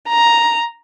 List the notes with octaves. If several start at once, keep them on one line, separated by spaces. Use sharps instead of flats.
A#5